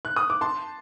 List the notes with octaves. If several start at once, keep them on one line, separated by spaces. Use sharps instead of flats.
F#6
D#6
D6
A5 C6